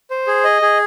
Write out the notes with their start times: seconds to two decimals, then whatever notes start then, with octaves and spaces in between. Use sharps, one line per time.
0.10 C5
0.27 G#4
0.44 D#5
0.62 G#4